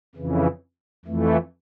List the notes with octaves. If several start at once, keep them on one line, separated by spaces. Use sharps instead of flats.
F2 C#3 E3
F2 E3 A3